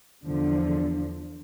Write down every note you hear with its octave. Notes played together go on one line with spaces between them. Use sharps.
E2 D3 F3